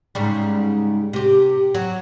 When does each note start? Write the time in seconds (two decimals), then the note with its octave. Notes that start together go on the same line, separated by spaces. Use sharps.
0.15 G#2 C#3 G3
1.13 C3 G4
1.75 F#3